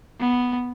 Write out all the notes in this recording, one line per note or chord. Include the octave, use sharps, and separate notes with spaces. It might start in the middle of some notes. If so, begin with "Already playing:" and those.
B3